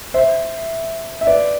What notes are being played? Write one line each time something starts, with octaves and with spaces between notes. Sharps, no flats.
C5 E5
E5
B4 D5